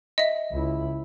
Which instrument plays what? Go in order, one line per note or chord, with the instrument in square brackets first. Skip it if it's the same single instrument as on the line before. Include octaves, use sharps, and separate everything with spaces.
[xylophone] D#5 E5
[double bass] C#2 E4